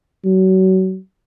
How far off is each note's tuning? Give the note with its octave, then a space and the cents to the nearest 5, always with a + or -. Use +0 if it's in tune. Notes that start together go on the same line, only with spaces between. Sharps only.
F#3 +30